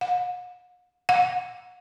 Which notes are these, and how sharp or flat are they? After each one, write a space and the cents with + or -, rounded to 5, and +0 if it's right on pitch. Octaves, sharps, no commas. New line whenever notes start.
F#5 -45
F#5 -35